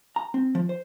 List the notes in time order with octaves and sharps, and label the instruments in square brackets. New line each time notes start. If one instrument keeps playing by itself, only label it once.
[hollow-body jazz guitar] A#5
C4
F3
C5